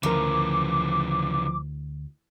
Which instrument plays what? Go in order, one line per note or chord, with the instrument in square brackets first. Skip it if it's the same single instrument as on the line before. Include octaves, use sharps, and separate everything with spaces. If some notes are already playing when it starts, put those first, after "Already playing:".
[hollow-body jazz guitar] D2 A#4 [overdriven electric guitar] C#3 E3 [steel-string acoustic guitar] F3 [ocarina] D6